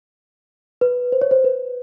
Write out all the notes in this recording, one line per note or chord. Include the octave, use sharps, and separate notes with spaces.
B4
C5
C#5
C5
B4